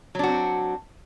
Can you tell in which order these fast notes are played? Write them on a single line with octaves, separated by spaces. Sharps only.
F#3 D4 F#4 C4